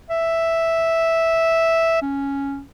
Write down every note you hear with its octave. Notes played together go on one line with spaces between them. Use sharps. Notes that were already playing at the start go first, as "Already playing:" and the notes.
E5
C#4